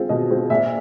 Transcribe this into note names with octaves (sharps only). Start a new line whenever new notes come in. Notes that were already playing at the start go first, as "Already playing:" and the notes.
Already playing: G#3 C4 F4
B2 D#5
G#3 C4 F4
A#2 E5